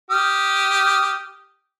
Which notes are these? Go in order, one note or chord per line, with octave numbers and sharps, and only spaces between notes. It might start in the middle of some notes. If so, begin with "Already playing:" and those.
G4 D#6 F6